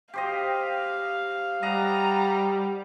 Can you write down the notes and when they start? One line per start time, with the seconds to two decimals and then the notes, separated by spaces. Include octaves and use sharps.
0.14 G4 C5 D#5 F5
1.63 G3 D#5 F#5 A#5